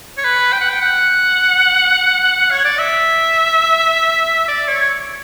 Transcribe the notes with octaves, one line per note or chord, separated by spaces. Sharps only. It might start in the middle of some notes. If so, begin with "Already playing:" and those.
C#5
B4
G5
F#5
G5
F#5
C#5
D5
E5
D5
C#5